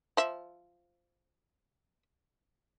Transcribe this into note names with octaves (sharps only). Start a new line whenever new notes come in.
F3 E5